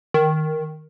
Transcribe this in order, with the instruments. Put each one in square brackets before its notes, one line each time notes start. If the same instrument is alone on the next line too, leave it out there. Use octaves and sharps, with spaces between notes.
[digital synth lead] D#3